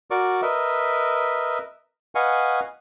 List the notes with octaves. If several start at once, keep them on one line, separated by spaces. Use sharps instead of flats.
F#4 A#4 D5 C#6 D6
A#4 B4 D#5 E5
B4 D#5 F5 F#5 G#5 C#6